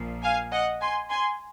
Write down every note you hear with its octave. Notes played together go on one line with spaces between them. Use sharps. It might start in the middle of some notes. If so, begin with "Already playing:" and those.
Already playing: A#1 A#2 F3
F5 G#5
D#5 F#5
G#5 C6
G#5 C6